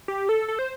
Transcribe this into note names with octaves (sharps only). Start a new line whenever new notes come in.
G4
A4
A4
C5